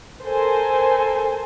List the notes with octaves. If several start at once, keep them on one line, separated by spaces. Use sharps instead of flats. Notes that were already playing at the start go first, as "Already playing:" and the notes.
A4 A#4 C5 G#5